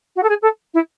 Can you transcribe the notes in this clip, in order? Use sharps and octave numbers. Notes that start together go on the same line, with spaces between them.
F#4
A4
G#4
A4
E4